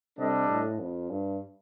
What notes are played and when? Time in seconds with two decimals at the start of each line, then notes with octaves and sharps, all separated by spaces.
0.18 C3 G3 D4 A4 D#5
0.49 A2
0.79 F2
1.10 G2